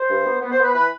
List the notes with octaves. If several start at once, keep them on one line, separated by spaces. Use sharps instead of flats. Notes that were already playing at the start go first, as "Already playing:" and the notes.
Already playing: C5
G2
B3
B3
C5
B3 B4
E3 B4